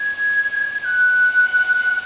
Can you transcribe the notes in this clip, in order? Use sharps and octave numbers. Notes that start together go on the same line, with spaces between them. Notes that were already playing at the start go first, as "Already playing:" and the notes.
Already playing: G#6
G#6
F#6